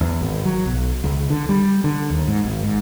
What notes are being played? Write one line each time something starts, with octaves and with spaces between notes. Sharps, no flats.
E2
G#1
F#3
B1
C#2
D3
G3
D3
D#2
G#2
G#1
G#2